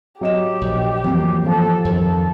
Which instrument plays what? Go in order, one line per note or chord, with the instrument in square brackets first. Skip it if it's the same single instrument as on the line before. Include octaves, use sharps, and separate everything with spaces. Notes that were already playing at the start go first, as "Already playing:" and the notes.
[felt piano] F#3 D#5 E7 [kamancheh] G4
[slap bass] A#1
[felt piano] F2 [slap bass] E3 F#3 A#3
[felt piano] F3 [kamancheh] A4
[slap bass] F2 D#3 [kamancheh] A4